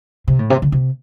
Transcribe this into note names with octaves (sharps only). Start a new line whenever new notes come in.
C3
A2
C3
D3
C3